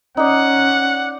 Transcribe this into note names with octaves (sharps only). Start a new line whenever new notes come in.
C#4 D#4 D5 F#5